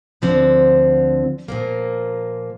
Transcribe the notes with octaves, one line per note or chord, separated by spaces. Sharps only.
D2 D3 F3 C4
A#2 F3 A#3